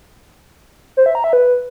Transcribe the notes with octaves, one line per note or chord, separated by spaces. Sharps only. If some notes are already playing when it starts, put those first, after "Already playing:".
C5
E5
A#5
E5
B4